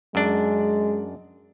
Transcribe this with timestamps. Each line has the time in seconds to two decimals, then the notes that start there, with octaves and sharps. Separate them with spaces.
0.15 F#2 G#3 D4